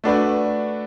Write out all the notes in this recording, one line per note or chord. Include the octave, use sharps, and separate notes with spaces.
A3 D4 F#4 B4 D5